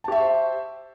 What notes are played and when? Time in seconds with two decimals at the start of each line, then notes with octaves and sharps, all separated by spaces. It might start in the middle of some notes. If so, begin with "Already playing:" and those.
0.04 A5
0.08 G4
0.12 E5
0.16 C#6
0.20 C5